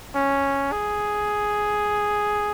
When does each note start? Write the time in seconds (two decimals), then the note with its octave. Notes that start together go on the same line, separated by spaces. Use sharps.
0.15 C#4
0.72 G#4